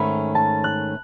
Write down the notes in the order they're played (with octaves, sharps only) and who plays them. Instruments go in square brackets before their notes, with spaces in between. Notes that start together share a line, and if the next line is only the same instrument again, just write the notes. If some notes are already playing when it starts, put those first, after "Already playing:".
Already playing: [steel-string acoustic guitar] G#2 D#3 A3 C#4 [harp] B5
[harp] A5
F#6